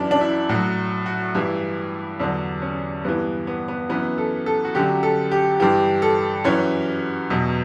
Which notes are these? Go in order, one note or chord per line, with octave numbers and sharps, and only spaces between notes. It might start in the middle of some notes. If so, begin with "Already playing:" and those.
Already playing: F#2 E3 D4
D4
E4
A2 F#3 F#4
F#4
G2 E3 E4
E2 D3 F#3 D4
C#4
G2 E3 B3
B3
B3
F#2 E3 B3
A4
A4
F#4
F#2 D3 F#3 G4
A4
G4
G2 E3 G4
A4
F#2 E3 C#5
E2 B2 F#3